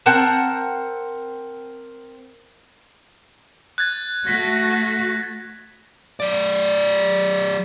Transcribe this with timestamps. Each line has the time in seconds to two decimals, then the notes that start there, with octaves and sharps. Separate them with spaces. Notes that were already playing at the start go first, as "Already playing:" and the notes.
0.06 C4 A#4 F#5 A5
3.78 F#6 G#6 A6
4.27 A3 F#4 A#6 B6
6.20 F#3 D5